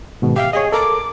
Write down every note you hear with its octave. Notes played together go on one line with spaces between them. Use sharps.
G#2 B2 D#3
G4 E5 F5 G5
G#4 C#5 D#5
A4 A#4 A#5 D6